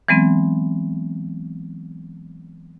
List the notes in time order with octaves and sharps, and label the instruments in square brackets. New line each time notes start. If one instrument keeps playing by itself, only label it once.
[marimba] E3 F#3 G#3 B3 C4